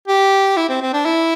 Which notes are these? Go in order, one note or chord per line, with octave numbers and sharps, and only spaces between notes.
G4
E4
C4
C4
D4
E4